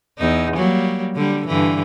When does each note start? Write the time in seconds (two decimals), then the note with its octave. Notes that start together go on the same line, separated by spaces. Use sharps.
0.18 E2 D#4
0.57 F#3 G3 A#3
1.15 D3 G3
1.47 G2 D3 E3